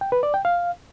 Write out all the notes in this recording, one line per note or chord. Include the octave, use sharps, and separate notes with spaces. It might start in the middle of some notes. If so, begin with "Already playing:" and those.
G5
B4
D5
G5
F5